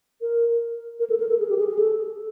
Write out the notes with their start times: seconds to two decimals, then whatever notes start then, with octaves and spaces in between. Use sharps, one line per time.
0.21 A#4
1.00 A#4
1.10 A4
1.20 A#4
1.29 A4
1.39 G#4
1.49 G4
1.58 G#4
1.69 G#4
1.79 A4